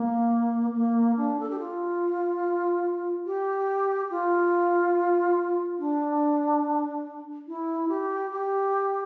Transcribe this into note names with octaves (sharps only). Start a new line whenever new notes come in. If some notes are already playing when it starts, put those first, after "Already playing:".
Already playing: A#3
A#3
D4
A4
G4
F4
G4
F4
D4
E4
G4
G4